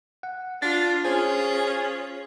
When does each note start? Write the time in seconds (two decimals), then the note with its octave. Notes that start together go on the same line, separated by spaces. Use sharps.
0.23 F#5
0.62 D4 F4 A6
1.05 C#4 F4 G#4 C5